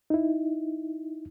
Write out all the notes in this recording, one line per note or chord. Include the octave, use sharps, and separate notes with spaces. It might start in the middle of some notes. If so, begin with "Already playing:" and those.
D#4 E4